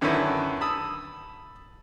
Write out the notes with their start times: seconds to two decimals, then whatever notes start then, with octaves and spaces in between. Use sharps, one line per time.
0.01 F#2 D3 D#3 C#4 E4 B4
0.61 A5 B5 D#6 E6